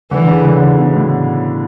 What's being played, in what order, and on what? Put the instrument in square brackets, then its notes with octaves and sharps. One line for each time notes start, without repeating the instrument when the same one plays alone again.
[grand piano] D3 [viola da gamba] E3
[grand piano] C#3
D3
C#3
B2
A2